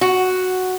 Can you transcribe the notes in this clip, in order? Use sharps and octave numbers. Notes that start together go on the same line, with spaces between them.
F#4